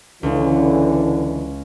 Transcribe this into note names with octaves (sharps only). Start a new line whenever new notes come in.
C#2 D3 E3 G#3